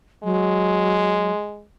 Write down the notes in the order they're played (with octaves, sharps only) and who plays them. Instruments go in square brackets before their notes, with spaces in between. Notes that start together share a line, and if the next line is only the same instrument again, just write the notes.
[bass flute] F#3 [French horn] G#3